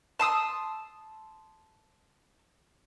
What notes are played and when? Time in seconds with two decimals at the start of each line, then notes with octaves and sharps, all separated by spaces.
0.19 A5 C6 D#6 E6